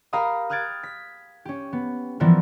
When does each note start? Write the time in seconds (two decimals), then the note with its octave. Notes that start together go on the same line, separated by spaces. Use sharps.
0.13 G4 A#4 F5 A#5 B5 D#6
0.50 D#6 F6 F#6 G#6 A6 D7
0.83 B6
1.45 C#4 G4
1.73 B3
2.20 E3 F3 G3 B3 E4 A#4